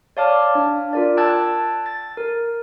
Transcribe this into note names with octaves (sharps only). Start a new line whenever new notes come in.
C#5 D5 F5 A5 D6 F6
D4
F4 A#4 D5
G5 A5 E6 F#6 G#6 A6
A6
A#4